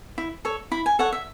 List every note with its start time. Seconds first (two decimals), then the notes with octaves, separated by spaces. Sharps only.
0.18 E4
0.45 A4 C#5
0.72 E4 B5
0.86 G#5
0.99 A4 C#5 F#5
1.13 E5